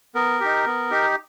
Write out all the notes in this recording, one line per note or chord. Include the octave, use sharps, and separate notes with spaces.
B3 A#4
D#4 G4
B3
D#4 G4